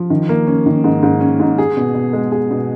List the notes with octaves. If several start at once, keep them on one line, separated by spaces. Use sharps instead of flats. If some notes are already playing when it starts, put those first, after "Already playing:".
Already playing: F3
D#3
A#3
C#4
D#3
G#2
G#2
C#4
G#2
G#4
B2
B2
G#3
G#4
B2